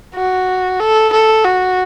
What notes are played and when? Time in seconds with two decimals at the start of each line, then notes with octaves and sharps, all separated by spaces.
0.15 F#4
0.80 A4
1.12 A4
1.45 F#4